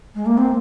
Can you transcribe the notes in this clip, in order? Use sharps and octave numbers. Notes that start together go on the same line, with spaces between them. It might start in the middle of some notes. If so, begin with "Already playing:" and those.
G#3
A#3
C4